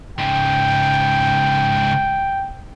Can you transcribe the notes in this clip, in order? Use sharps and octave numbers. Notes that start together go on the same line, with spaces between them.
G#2 C#3 G5